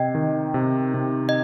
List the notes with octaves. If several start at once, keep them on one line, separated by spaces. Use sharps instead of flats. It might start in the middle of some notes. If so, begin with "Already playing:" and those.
Already playing: C3 D#5 G5
D#3
C3
C3
D#5